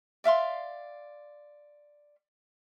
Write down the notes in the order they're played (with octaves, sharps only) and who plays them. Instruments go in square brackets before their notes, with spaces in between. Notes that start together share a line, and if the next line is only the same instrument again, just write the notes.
[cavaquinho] D5 E5 F5 C6